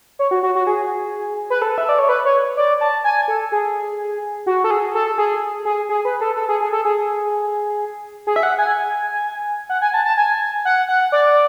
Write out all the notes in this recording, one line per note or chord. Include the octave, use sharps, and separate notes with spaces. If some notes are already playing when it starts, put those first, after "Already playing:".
C#5
F#4
F#4
F#4
G#4
B4
A4
E5
D5
C#5
B4
C#5
D5
A5
G#5
A4
G#4
F#4
A4
G#4
A4
G#4
G#4
G#4
B4
A4
A4
G#4
G#4
A4
G#4
G#4
E5
F#5
G#5
F#5
G#5
A5
A5
G#5
F#5
F#5
D5